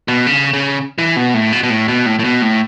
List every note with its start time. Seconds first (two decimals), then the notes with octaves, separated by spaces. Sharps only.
0.08 B2
0.26 C#3
0.53 C#3
0.98 E3
1.17 B2
1.34 A2
1.52 B2
1.63 B2
1.70 A2
1.88 B2
2.06 A2
2.19 A2
2.24 B2
2.42 A2